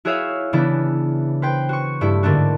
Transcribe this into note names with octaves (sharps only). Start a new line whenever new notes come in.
E4 F#4 G#4 C#5 E5 F5
C#3 E3 B3 D4 E4
B4 C5 G5
F#4 C#6
G2 A3 E4
G#2 D3 A3 A#3 D4 F#4